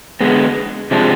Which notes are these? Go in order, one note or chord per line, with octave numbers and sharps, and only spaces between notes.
D3 G#3 B3
C3 F3 G#3 D4